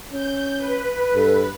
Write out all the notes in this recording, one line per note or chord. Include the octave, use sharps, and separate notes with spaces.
C#4 G6
B4
G2 A4